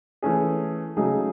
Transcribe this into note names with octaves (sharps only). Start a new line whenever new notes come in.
E3 A3 C#4 G#4
C#3 F#3 A3 D#4 G#4